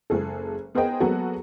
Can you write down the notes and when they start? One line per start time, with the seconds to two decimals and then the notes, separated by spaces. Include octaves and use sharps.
0.10 F#1 G#3 G#4 A4
0.75 B3 G#4 A#4 C5 D#5 G5
1.00 F#3 G#3 A#3 B3 F#4 A4